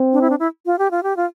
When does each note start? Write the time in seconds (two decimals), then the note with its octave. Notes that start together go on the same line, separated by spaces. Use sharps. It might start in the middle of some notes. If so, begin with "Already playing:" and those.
Already playing: C4
0.13 D4
0.21 E4
0.30 D4
0.39 E4
0.66 F4
0.79 G4
0.91 F4
1.03 G4
1.17 F4